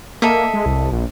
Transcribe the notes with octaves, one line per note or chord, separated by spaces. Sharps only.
A#3 A4 D#5 E5
G#3
C2
A#1